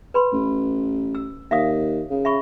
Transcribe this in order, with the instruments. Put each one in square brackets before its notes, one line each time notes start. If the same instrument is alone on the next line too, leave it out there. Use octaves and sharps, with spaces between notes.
[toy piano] B4 B5 C6
[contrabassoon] A1
[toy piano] E6
[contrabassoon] D#2 [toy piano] E5 F5 D#6
[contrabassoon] C#3
[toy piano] E5 B5 C#6